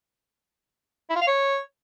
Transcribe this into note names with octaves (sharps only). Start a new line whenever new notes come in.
E4
F4
F5
C#5